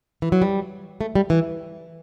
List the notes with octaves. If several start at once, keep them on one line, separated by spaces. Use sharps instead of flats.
E3
F#3
G3
A3
G3
E3